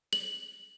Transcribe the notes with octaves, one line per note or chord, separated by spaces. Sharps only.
F#7